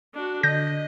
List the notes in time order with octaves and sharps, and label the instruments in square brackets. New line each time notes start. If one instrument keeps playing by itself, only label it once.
[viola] D4 F#4
[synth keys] D3 [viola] D#5 [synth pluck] G6 A#6